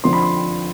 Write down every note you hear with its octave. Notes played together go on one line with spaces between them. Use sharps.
F2 D3 F3 C4 C6
B5
C6